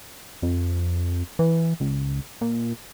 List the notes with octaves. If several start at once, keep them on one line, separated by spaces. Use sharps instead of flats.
F2
E3
C#2
A#2